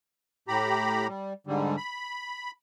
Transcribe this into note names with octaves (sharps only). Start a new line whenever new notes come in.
A2 G4 A#5 B5
G3
G#2 D3 G3
B5